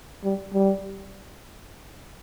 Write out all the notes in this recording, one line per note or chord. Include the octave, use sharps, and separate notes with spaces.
G3
G3